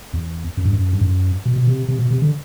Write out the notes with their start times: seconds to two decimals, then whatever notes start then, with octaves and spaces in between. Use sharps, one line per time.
0.13 E2
0.57 F#2
0.65 G2
0.73 F#2
0.93 G2
1.01 F#2
1.45 B2
1.56 B2
1.67 C3
1.88 C3
1.99 B2
2.11 C3
2.22 D3